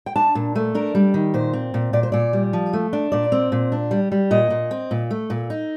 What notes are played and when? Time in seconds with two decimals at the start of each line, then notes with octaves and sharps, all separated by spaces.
0.06 G5
0.16 D4 A5
0.35 A#2
0.55 A3
0.75 D4 A#4
0.95 G3
1.14 D#3
1.34 A#2 C5
1.53 C4
1.74 A#2
1.93 A#2 D5
2.03 C5
2.12 A#2 D5
2.33 G3
2.53 F3
2.73 A3
2.93 D4
3.12 A#2 D5
3.32 C4
3.52 A#2
3.72 D4
3.91 G3
4.12 G3
4.31 A#2 D#5
4.50 A#2
4.71 C4
4.91 A#2
5.11 A3
5.30 A#2
5.50 D#4